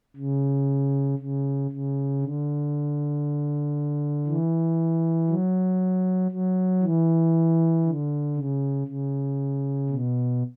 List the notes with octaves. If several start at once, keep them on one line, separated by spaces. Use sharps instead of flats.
C#3
C#3
C#3
D3
E3
F#3
F#3
E3
D3
C#3
C#3
B2